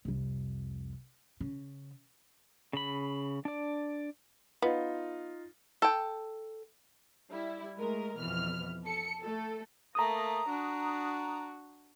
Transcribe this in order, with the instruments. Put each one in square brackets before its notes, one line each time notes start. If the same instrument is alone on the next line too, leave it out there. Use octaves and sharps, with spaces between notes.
[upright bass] C2 F2
C#3
[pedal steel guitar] C#3 B5
D4 D5
[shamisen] B3 [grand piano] D#4 F4
[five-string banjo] A4 G5
[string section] G3 E4
G#3 A3 A#4
F2 B2 E3 F6
A4 C#7
A3 A4
[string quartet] A3 A#3 [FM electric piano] A#5 D#6
[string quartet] D4 F#4